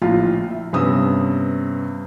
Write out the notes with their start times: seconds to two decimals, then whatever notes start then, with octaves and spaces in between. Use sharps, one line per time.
0.02 A#1 A2 F4
0.50 E5
0.73 G2 C3 B3 C#4 D#6 E6